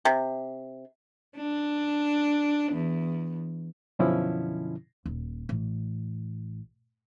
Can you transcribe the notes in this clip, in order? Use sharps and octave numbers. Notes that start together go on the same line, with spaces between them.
C3
D4
E2
F#2 B2 D3 F3 C#4 E4
D#1
A1